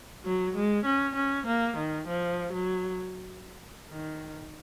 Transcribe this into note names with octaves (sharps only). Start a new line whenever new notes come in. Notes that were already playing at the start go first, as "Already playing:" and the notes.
F#3
G#3
C#4
C#4
A#3
D#3
F3
F#3
D#3